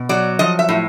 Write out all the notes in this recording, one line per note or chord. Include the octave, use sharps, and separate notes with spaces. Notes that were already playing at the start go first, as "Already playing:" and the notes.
Already playing: B2
F#3 D5
F3 D#5
E5
A2